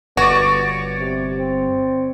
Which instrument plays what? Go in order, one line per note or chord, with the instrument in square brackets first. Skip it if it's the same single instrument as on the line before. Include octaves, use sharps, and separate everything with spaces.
[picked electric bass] G1 [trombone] B3 [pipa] F#4 [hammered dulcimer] C#5 D5
[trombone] C3
C4